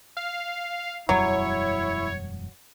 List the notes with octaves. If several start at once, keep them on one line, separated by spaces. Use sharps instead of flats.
F5
E1 F#2 F#3 G3 E4 C#5